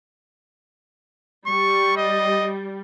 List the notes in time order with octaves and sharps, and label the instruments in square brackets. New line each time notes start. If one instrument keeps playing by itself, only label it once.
[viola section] G3 [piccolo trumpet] C#6
[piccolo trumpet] D#5